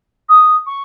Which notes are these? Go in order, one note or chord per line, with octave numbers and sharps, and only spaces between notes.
D#6
C#6